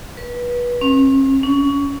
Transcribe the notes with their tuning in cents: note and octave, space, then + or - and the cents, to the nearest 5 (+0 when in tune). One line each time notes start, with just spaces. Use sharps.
B4 -25
C#4 -45
C#4 +25